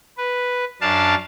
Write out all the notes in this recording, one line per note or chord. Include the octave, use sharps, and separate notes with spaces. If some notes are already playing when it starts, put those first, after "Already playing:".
B4
F#2 D4 F5 A5